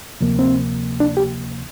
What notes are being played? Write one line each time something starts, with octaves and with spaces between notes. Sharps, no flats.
D2 C3 F3 A#3
C4
D4
G4